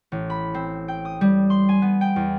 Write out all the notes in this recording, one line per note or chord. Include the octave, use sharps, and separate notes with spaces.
A1
B5
C4
G5
D#6
G3
C6
G#5
B3
G5
E2